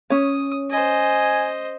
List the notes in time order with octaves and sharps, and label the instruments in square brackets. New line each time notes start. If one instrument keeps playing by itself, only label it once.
[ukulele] C#4 C#5 [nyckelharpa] D#6
[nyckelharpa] C5 D#5 [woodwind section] G#5